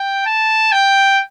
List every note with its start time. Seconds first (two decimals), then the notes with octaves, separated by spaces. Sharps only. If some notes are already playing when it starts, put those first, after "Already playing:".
Already playing: G5
0.26 A5
0.72 G5